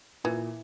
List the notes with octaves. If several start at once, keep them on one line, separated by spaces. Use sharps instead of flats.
A#2 E3